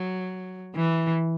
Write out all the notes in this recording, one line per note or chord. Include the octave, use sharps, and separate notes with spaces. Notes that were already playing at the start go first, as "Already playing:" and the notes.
Already playing: F#3
E3